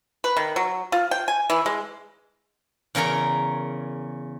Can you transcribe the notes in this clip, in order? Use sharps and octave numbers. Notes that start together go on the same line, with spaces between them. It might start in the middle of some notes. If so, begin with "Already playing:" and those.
B4
D#3
F#3
F4
G5
G#5
E3
G#3
E2 C#3 A#4 C#5 A#5